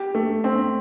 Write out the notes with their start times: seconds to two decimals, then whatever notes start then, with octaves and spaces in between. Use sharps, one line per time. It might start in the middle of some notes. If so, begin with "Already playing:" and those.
Already playing: G4
0.15 A3
0.44 C4